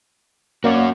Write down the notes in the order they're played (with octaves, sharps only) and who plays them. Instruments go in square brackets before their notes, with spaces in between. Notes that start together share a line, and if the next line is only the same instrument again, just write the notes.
[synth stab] A#3 D5 C#6 [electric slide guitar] C#4 F#4